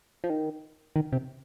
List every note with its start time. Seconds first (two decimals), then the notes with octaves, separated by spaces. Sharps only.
0.24 F3
0.30 D#3
0.96 D#3
1.12 C3